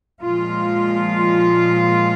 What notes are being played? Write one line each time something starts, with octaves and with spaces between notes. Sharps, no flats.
A#2 F3 G#3 F4